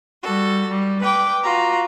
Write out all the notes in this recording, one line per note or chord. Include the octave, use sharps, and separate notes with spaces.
G3 F#4 A4
G3
B4 G5 D6
F4 F#4 A#5